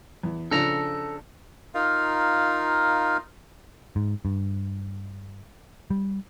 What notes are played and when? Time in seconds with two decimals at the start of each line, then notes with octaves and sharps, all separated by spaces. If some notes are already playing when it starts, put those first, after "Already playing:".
0.23 E2
0.51 C#3 F3 D4 A4 A#5
1.74 D#4 F4 A#4 F5
3.96 G#2
4.25 G2
5.90 G3